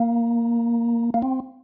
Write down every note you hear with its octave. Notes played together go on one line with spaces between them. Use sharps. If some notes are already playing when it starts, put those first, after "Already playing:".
Already playing: A#3
A#3
C4